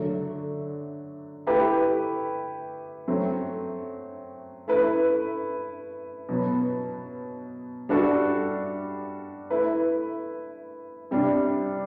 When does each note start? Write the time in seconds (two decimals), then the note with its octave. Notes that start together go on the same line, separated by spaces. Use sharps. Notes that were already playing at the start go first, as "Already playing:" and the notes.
Already playing: D3 F#3 A3
1.47 A3 E4 G4 B4
3.08 F#3 A3 C4
4.68 A3 E4 B4
6.29 B2 F#3 B3
7.89 G3 D4 F#4 A4
9.50 A3 E4 B4
11.11 C3 G3 D4